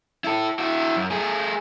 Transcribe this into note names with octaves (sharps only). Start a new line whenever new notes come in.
E4 A4
E4 F#4
F#2
A3 G#4